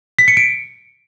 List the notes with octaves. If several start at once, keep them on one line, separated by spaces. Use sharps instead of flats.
B6
C#7
D7